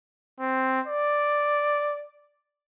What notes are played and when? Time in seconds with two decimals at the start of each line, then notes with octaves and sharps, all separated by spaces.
0.40 C4
0.87 D5